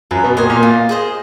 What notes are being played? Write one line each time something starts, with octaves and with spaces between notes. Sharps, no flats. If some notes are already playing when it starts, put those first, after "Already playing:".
F#2 F#3 B4
B2 B3
A#2 A#3 D#5 G#5
A#2 A#3
F4
G#4 C5 D#5